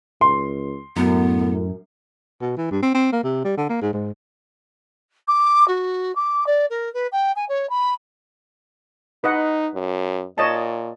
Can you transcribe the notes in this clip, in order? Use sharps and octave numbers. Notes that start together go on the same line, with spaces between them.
C#2 C6
F#2 A2 B3
B2
E3
G2
C4
C4
A#3
C3
G3
D3
A#3
G#2
G#2
D6
F#4
D6
D5
A#4
B4
G5
G#5
C#5
B5
D#4 B4 D#5 F#5
F#2
A#2 C#5 D#5 A5